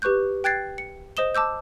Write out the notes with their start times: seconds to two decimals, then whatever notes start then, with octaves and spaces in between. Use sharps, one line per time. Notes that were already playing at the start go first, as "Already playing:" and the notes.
0.02 G4 B4 C#6 F#6 G6
0.44 G5 F#6 G#6 A6 C7
0.78 C#7
1.17 C5 D#5 D#6 E7 G7
1.35 A5 D6 E6 G6